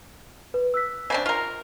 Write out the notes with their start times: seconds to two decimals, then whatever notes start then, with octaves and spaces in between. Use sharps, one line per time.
0.54 B4
0.74 E6 F#6 B6
1.10 C#3 C4 D4
1.26 F4 A#4 F7